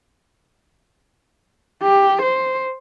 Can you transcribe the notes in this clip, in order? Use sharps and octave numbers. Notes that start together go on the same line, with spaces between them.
G4
C5